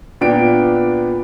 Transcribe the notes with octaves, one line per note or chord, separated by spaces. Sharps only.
A#2 B3 D4 G5 D7